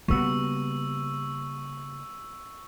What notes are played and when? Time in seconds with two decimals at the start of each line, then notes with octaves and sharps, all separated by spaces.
0.08 C#3 G3 A#3 B3 F#4 C#6 E6